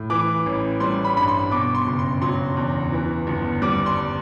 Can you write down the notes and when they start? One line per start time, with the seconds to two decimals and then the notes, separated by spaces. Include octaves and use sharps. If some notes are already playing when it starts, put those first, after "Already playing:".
Already playing: A2
0.10 E3 D6
0.46 A1
0.80 G3 C6
1.04 B5
1.17 G2 B5
1.28 C6
1.51 B2 D6
1.75 C6
1.87 F#1
1.99 C6
2.22 F#3 C6
2.56 E2
2.92 E3
3.27 G1
3.62 G3 D6
3.86 C6